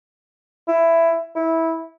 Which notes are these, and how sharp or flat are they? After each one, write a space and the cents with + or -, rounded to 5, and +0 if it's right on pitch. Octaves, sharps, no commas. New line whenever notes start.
E4 +10
E4 -15